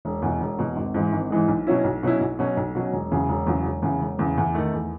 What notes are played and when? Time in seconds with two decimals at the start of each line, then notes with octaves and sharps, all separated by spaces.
0.05 E1
0.22 E2 B2
0.40 E1
0.59 E2 B2
0.76 G#1
0.94 G#2 E3 G#3
1.13 G#1
1.30 G#2 E3 G#3
1.48 B1
1.67 B2 F#3 C#4 E4
1.84 B1
2.03 B2 F#3 C#4 E4
2.21 B1
2.39 B2 F#3 C#4
2.57 B1
2.75 B2 F#3 C#4
2.93 E1
3.11 E2 C#3 F#3
3.29 E1
3.47 E2 C#3 F#3
3.65 E1
3.82 E2 C#3
4.01 E1
4.19 E2 C#3
4.38 E2
4.55 D#3 A3
4.73 E2